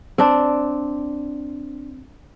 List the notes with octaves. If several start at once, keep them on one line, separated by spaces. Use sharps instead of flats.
C4 D4